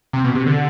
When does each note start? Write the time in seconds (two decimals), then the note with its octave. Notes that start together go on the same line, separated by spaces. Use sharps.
0.13 C3
0.24 B2
0.35 C3
0.46 D3